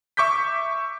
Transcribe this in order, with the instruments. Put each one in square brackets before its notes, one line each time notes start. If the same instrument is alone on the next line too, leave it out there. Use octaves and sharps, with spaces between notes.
[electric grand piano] E5 C#6 D6 G6 B6